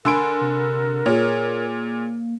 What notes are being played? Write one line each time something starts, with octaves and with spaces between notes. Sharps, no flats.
D3 A#4 G#5 B5 C6 E6 D7
C3
A#2 A#3 G#4 C#5